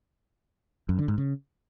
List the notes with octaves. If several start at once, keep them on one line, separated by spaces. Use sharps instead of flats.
F#2
D3
G#2
C#3